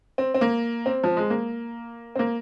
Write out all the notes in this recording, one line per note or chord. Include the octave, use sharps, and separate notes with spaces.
C4
C4
A#3
C4
F3
G#3
A#3
C4
A#3